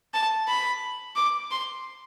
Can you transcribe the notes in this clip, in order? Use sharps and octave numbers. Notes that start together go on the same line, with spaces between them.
A5
B5
D6
C6